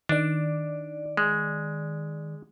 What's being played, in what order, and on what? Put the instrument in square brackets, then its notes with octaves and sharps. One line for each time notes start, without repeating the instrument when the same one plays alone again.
[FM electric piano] D#3 D5 [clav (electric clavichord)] D4
[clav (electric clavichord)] G#3